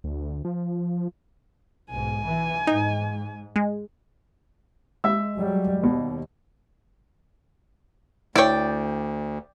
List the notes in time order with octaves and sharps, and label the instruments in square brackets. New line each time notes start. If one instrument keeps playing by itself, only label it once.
[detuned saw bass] D2
F3
[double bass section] B1 G#2 [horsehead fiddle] G#5
[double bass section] E3
[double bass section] G#2 [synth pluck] D#4
[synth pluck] G#3
[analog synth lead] G#3 [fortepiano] E5 E6
[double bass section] F#3 G3
[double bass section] D#2 [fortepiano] B2
[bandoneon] D2 [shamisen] E4 C#5 [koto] D5 G5